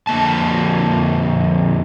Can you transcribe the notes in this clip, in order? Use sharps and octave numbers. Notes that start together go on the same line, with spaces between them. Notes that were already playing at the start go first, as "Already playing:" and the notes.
F2 D3 A#3 A5